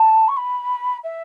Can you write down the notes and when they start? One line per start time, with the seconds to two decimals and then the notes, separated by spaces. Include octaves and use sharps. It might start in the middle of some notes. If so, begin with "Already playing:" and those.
Already playing: A5
0.28 C#6
0.37 B5
1.03 E5